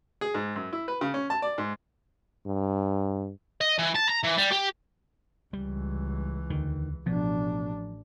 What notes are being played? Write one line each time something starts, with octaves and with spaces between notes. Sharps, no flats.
G#4
G#2
F#2
E4
B4
C#3
C#4
A5
D5
G#2
G2
D#5
E3
A5
A#5
E3
G3
G4
C#2 E3 G3
D#2 D3 D#3
A1 B2 F3 D4